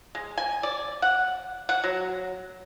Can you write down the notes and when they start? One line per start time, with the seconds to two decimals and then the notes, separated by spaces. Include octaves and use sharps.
0.15 G#3
0.38 G#5
0.63 D5
1.02 F#5
1.69 F#5
1.84 F#3